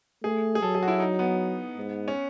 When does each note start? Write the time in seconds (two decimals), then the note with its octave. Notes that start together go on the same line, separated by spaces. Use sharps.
0.23 A3 G#4
0.55 G#4
0.62 F#3 A4
0.75 G#4
0.83 F#4
0.88 E4
1.00 D#4
1.19 B3
1.77 G#2
2.08 C#4